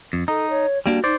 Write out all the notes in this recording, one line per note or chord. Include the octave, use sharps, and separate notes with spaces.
F2
D#4 A4
C#5
G3 A#3 D4 F#4
D#4 C5 D5